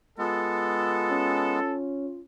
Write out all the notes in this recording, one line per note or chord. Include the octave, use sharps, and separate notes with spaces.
G#3 B3 F4 A4
C#4